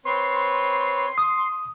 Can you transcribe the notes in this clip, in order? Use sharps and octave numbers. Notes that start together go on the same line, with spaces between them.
C4 B4 C#5 C6
D#6